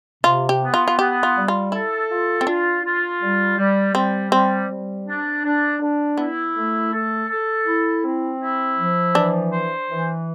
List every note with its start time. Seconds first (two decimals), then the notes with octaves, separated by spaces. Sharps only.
0.24 C3 F4
0.49 G4
0.62 B3
0.74 F4
0.88 F4
0.98 B3 G4
1.23 F4
1.35 G3
1.48 F4
1.72 E4 A4
2.10 F4
2.41 C4
2.47 D4 F4
2.83 F4
3.21 G3
3.58 G3
3.95 G3 C4
4.32 G3 C4
4.70 G3
5.07 D4
5.44 D4
5.80 D4
6.18 B3 E4
6.55 A3
6.92 A4
7.29 A4
7.66 E4
8.03 C4
8.40 E4
8.78 F3
9.15 E3 D4
9.51 C5
9.89 E3